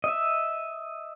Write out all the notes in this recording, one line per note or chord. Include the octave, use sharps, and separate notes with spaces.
D#5 E5